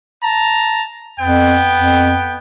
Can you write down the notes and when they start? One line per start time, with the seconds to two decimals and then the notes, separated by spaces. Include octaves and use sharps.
0.23 A5 A#5
1.20 F2 B3 G5
1.75 F2